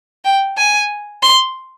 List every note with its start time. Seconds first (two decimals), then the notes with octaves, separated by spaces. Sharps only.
0.25 G5
0.58 G#5
1.23 C6